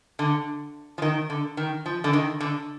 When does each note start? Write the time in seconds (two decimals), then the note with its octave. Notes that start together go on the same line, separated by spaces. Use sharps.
0.19 D3
0.98 F3
1.02 D#3
1.30 D3
1.57 D#3
1.86 F3
2.04 D3
2.13 D#3
2.40 D3